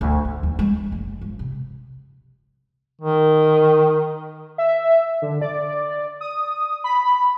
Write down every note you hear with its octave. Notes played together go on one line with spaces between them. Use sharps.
D2
D2
D#2
G#3
G#3
F#1
F3
C3
D#3
E5
D3
D5
D#6
B5